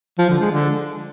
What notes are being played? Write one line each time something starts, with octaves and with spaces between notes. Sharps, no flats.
F3
D3
G#3
D3